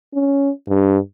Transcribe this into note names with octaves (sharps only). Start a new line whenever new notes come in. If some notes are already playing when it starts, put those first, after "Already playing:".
C#4
G2